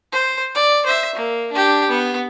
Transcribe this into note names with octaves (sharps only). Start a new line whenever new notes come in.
C5
D5
C5 E5
A#3
D4 G4
B3